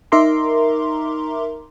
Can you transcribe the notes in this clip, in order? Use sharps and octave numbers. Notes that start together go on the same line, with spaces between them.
D#4 A#4 E5 A#5 C6 D6